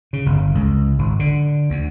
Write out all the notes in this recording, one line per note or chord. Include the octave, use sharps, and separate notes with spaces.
C#3
G1
C#2
G#1
D3
D2